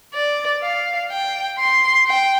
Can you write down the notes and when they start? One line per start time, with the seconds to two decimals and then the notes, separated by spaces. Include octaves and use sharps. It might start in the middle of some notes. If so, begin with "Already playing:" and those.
0.14 D5
0.63 F5
1.11 G5
1.59 C6
2.07 G5